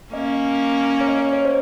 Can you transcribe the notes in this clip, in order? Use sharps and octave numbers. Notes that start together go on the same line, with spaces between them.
A#3 C#4 D#5
C#5
D#5
C#5
D#5
C#5
C5